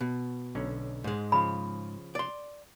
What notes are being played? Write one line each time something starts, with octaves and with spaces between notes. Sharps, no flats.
B2
B1 D3 C#4
G#2 G#3
C#3 F3 F5 B5
D5 C6